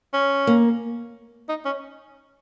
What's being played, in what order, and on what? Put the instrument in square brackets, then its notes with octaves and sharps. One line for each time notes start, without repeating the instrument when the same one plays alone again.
[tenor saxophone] C#4
[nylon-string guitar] A#3
[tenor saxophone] D#4
C#4